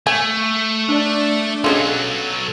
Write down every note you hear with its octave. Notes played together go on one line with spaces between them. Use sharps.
A3 G#5
D4 D5
B1 F#3 G#3 C#4 F4 A4